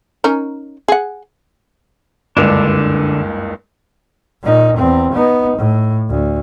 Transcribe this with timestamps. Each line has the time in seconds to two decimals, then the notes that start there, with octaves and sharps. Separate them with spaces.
0.24 C#4 D#4 A#4
0.88 G#4 F#5
2.37 F#1 C#2 G2 D3 D4
4.42 A#2 D#4
4.77 E2 C4
5.12 B3 D#4
5.58 A2
6.10 D2